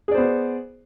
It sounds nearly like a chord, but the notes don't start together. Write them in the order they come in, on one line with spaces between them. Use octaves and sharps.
G#4 D5 C5 B3